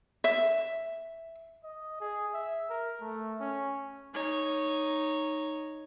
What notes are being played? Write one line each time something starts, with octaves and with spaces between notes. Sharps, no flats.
E5
D#5
G#4
E5
A#4
A3
C#4
D#4 C#5